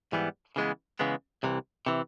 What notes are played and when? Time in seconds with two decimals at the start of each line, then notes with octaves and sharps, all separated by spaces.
0.12 G#2 E3 G3 B3
0.56 C#3 E3 G#3 B3
0.99 C#3 E3 G#3 B3
1.43 C2 C3 E3
1.86 C3 E3